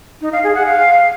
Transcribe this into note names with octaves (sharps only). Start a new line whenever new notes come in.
D#4
F5
G#4
F#5
F5